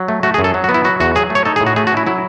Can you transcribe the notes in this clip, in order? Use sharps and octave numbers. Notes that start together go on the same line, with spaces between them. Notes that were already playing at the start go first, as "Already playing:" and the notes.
Already playing: F#3
A3
A3 F#4
G#4
F#2
A4
F#3
F#4
B3
E4
F#3 F#4
E2 F#4
F#3 G#4
A3 C#5
D#4 A4
G#4
A2
F#4
A3 G#4
F#4
C#4 E4
F#3 E4